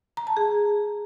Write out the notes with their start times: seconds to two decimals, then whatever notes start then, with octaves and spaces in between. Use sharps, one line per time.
0.17 A#5
0.27 A5
0.37 G#4